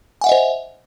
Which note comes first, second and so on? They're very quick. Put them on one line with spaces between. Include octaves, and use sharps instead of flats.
G#5 F#5 E5 D#5 C5